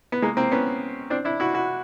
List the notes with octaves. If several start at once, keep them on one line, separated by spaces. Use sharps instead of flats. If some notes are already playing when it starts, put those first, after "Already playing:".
B3
G#3 A#3
A#3 C4
B3 C#4
C4 D4
D4 E4
E4 F#4
E4 F#4